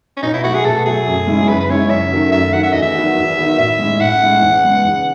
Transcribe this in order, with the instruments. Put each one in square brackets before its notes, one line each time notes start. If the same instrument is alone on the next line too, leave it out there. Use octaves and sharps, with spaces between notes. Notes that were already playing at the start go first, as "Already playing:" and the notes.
[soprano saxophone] C#4
[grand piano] B2 [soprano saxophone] D#4
[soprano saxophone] E4
[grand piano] F#3 A3 [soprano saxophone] F#4
[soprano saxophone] G#4
[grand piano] B2 [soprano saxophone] A4
[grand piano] F#3 A3 [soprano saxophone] G#4
[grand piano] F#2
C#3 G#3 C#4 E4
[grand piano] F#2 [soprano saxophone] B4
[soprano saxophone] B4
[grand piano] C#3 G#3 C#4 E4 [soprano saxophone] C#5
[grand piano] F#2 [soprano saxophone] E5
[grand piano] D#3 F#3 A3
[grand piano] F#2 [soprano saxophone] E5
[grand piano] D#3 F#3 A3 [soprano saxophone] F#5
[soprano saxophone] E5
[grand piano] E2 [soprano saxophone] D#5
[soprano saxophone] E5
[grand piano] D#3 F#3 B3 F#4
E2
D#3 F#3 B3 F#4
[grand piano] A2 [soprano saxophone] E5
[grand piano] G#3 C#4 E4
[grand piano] A2 [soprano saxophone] F#5
[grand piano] G#3 C#4 E4
E2
C#3 G#3 B3
E2